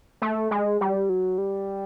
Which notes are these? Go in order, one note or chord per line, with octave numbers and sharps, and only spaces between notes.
A3
G#3
G3
F#3
G3